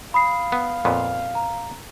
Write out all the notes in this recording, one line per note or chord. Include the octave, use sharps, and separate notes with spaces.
F5 B5 D#6 C7
B3
F2 A#2 B3
A#5